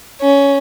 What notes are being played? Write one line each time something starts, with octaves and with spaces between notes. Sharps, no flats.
C#4